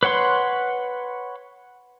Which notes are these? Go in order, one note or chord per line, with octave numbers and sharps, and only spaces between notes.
B4 C#5 F#5 C6